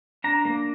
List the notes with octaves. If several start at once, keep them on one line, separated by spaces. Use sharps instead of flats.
D4 A#5
A#3